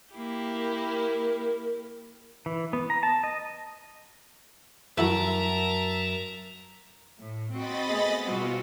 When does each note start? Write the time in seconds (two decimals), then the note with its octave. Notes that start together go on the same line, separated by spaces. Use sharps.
0.16 A#3 E4 G4
0.57 A#4
2.46 E3
2.73 B3
2.90 A#5
3.03 A5
3.24 D#5
4.98 F#2 A3 E4 F#4 A#4 E5 A5 A#5
7.20 A2
7.53 C4 F#4 D#5 B5 A6
7.88 A3 B3 G#4
8.25 B2 G3 C4 F4 F#4